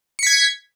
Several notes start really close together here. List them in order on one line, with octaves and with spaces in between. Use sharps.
C#7 B6 G#6